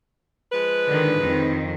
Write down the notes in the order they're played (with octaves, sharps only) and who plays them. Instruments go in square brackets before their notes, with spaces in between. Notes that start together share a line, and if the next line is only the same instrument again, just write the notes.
[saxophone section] F3 G#3 B4
[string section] D3 D#3
F2 D#3